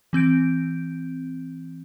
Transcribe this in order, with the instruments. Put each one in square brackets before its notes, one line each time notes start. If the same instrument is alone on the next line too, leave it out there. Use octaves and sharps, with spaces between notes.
[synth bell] E3 C4 G6 D7